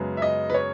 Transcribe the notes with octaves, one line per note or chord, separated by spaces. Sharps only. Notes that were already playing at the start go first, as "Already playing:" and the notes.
Already playing: F#2 C#3 G#3 B3
E5
D#5
B4
C#5